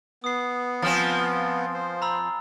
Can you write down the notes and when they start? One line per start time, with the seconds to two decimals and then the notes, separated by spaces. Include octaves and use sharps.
0.24 B3 D#6 C7
0.82 F3 C4 G#5 F6 A6
1.74 C5
2.02 A#5 B5 E6